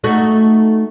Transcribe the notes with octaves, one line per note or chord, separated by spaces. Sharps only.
A3 D#4 F#4